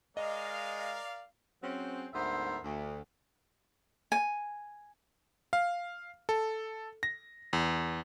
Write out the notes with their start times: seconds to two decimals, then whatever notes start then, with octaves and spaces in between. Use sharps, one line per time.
0.17 G#3 A#4 D5 D#5 F5
1.63 F#3 C4 C#4 G#4 C5
2.13 D2 G#2 B3 A#4 C5 E5
2.64 D2
4.12 G#5
5.53 F5
6.29 A4
7.03 A#6
7.53 E2